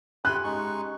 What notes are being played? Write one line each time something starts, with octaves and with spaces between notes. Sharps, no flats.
C#4 G4 G#5 B5 C6 F#6
G#3 D#4 C#6